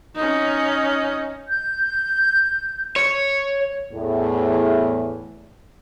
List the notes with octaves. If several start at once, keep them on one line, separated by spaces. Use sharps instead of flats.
C#4 D#4
G6
C#5
E2 A2